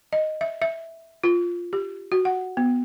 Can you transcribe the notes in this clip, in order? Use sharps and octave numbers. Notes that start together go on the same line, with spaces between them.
D#5
E5
E5
F4
G4
F#4
F#5
B3